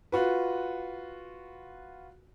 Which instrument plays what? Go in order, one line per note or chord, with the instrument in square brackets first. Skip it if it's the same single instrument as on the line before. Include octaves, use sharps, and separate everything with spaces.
[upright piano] F4 F#4 B4